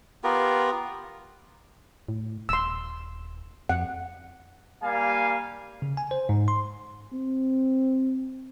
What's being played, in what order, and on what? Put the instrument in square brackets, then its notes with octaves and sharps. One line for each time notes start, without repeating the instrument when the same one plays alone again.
[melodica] B3 F4 G4 A#4
[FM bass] A2
[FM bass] D#1 [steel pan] C6 E6
[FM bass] F2 [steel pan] F#5
[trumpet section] G3 A#3 F5 G#5
[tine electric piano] C#3
G#5
C5
G#2
C6
[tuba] C4